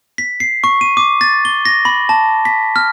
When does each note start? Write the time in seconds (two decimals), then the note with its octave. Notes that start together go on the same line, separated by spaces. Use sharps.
0.18 B6
0.40 C7
0.64 C#6
0.81 D#7
0.97 D6
1.21 A6
1.45 G7
1.65 A#6
1.85 B5
2.09 A5
2.45 B6
2.76 F6